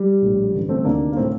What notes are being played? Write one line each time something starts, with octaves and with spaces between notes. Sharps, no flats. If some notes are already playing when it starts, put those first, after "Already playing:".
Already playing: G3
A#1 A2
A1 G2 D3
A3 C4
D2 C3 D#3 A#3 D4
A#3
A2 A3 C4